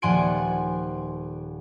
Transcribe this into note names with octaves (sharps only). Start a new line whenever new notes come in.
D#1 F3 F#5 G#5 C6 D7